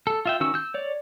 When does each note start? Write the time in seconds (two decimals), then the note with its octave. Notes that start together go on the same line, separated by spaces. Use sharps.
0.07 A4
0.26 F4 E5 G5
0.40 D#3 C#4 F#4 E6
0.54 E6 G6
0.74 C#5 D5